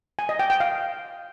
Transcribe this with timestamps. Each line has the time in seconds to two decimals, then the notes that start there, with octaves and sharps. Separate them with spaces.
0.19 G#5
0.29 D#5
0.39 G5
0.50 G5
0.60 F5